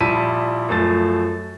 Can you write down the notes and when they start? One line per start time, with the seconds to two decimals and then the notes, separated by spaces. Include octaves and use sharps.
0.01 A#1 G3 E4 A5 B6 D#7
0.69 F#2 F3 A3 A6